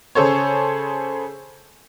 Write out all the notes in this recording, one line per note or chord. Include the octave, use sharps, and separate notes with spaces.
C#3 G#4 A4 C5 C#5